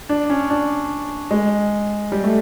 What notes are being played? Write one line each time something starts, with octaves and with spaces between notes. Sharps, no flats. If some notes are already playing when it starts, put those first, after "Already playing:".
D4
C#4
D4
G#3
G3
A3